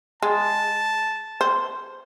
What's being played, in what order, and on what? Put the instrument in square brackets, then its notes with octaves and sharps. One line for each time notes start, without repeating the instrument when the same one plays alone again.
[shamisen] G#3 [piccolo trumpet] A5
[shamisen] C5